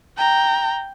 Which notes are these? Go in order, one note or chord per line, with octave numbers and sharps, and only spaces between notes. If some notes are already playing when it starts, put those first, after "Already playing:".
G5 A#5